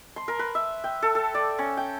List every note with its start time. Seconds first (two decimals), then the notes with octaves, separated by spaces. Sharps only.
0.16 C6
0.28 A#4
0.39 B4
0.55 E5
0.84 G5
1.02 A4
1.15 A4
1.34 D5
1.59 C#4
1.77 G5